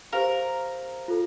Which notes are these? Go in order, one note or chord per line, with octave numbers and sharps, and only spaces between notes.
G4 A#4 C5 F5
F4 A4